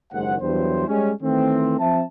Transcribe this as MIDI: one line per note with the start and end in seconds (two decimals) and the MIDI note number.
0.12 0.36 30
0.12 0.36 39
0.12 0.36 56
0.12 0.36 72
0.12 0.36 78
0.41 0.84 40
0.41 0.84 43
0.41 0.84 54
0.41 0.84 64
0.41 0.84 72
0.88 1.12 55
0.88 1.12 56
0.88 1.12 61
1.22 1.77 51
1.22 1.77 52
1.22 1.77 57
1.22 1.77 60
1.79 2.02 53
1.79 2.02 60
1.79 2.02 76
1.79 2.02 81